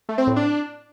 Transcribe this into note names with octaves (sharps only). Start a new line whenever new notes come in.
A3
C4
A2
D4